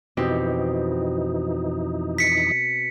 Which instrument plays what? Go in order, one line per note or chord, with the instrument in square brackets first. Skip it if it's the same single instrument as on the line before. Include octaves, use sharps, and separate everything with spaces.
[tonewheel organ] F2 E3 D#4 [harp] B2 C4 G4
[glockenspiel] B6 C#7